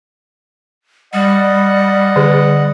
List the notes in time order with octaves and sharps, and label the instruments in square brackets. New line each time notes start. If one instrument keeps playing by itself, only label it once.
[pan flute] G3 [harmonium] D#5 F#5
[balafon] D3 G#4